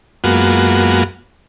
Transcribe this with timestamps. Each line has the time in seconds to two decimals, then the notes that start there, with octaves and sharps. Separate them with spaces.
0.24 F#2 G#3 A#3 B3 F4 F#4